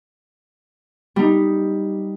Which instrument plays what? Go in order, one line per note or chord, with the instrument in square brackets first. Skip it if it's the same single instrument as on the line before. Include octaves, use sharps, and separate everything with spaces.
[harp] G3 D#4